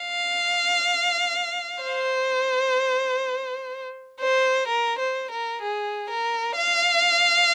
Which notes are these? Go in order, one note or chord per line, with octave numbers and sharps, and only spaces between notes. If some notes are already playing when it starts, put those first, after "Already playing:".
Already playing: F5
C5
C5
A#4
C5
A#4
G#4
A#4
F5